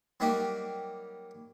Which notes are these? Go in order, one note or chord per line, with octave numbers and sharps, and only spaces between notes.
F#3 G3 A#3 D#4 G4